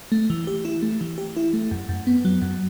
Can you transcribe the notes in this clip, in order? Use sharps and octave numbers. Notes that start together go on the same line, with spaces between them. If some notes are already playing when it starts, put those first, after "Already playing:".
A3
E3
G4
E4
A3
E3
G4
E4
A3
F#2
F#2
B3
F#3
F#2